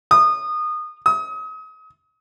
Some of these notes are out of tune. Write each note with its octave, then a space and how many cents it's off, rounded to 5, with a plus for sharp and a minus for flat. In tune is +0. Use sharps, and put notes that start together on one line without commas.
D#6 -25
D#6 +35